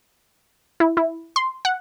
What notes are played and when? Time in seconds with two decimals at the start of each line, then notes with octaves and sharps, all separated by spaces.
0.80 E4
0.97 E4
1.36 C6
1.65 F#5